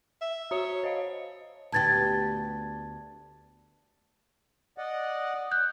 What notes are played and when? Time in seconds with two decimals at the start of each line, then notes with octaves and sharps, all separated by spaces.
0.21 E5
0.51 F#4 C#5 A#5 D#6
0.83 C5 D#5 F5
1.72 D2 B3 G4 A5 G#6 A6
4.78 D5 D#5 F#5
5.51 F#6 G6